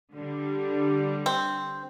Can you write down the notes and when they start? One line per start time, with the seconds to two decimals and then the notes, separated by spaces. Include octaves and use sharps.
0.14 D3 G3
1.26 C4